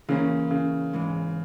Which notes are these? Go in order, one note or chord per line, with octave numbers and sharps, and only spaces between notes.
C#3 E3 A#3 C#4
C#3
G#2 E3 G#3